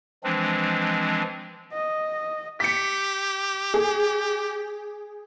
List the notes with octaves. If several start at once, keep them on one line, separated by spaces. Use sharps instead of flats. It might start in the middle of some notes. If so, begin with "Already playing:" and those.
E3 F3 G#3 C4 D4
D#5
G4 B6 C#7
G#4